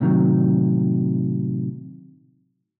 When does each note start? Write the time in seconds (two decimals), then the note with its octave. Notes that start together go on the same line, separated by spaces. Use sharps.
0.01 A2 C3 D#3 F3 F#3